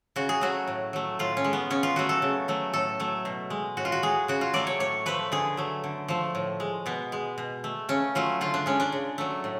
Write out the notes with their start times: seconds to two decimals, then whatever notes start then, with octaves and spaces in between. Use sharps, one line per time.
0.16 C#3 F#4
0.29 G#4
0.41 F#3 A3 F#4
0.67 A2
0.93 F#3 A3
1.19 A2 F4
1.37 C#4
1.44 G#3
1.53 B3
1.70 C#3 C#4
1.83 F4
1.96 F#3 A3 F#4
2.09 A4
2.22 C#3
2.48 F#3 A3
2.74 A2 A4
3.00 F#3 A3
3.25 B2
3.50 G#3
3.77 A2 F#4
3.85 F4
3.92 F#4
4.03 G#3 G#4
4.28 C#3 F#4
4.41 F4
4.53 F#3 A3 D5
4.67 C#5
4.80 A2 C#5
5.06 F3 A3 B4
5.32 D3 G#4
5.57 F#3 A3
5.84 D3
6.08 F3 A3
6.35 A2
6.60 G#3
6.86 B2 B3
7.12 G#3
7.38 B2
7.64 A3
7.89 C#3 C#4
8.15 F#3 A3 F4
8.41 D3 F4
8.54 D4
8.66 G#3 C#4
8.80 D4
8.92 C#3
9.18 F#3 A3
9.44 A2